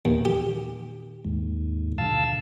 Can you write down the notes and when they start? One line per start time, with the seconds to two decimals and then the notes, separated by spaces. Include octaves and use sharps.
0.05 D#2 A#2 D#3
0.25 G4
1.25 D#2 G#2
1.98 G2 B2 D3 F5 A5 E6